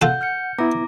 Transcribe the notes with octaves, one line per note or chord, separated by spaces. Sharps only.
F4 A4 F#5 G6
F6 G6 C#7
B3 E4 A#5 D6 A#6